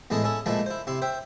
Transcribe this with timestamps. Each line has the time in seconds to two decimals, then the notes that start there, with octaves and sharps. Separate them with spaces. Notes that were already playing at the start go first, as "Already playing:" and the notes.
0.10 E2 A2 G#3 E4 A4 D#5
0.24 C#4 E4 G#4 A4
0.46 A#2 F3 G#3 A3 E4 A4
0.66 E4 C5
0.87 C3 E4 C6
1.02 C5 E5 G5